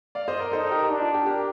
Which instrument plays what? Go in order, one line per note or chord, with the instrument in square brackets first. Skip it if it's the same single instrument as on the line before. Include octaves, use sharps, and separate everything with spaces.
[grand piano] D5 F5
C5 D#5
A#4 D5
[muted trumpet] D#4 [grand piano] A4 C5
[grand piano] G4 A#4
[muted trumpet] D4
[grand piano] F4
G4
G4 A#4